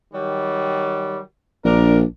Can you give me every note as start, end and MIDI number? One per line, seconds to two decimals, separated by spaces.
0.13 1.18 51
0.13 1.18 54
0.13 1.18 55
1.65 2.04 34
1.65 1.99 62
1.65 1.99 70